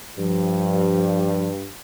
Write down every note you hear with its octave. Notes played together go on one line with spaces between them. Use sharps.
G2 F3